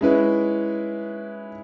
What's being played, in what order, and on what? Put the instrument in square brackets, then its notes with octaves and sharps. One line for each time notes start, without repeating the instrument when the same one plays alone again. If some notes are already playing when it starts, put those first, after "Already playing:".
[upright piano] G#3 C#4 E4 B4